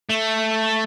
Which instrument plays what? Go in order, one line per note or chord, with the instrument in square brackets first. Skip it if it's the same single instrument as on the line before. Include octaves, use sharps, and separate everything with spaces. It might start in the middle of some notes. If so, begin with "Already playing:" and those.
[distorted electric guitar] A3